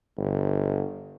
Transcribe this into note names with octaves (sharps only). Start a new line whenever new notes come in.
G1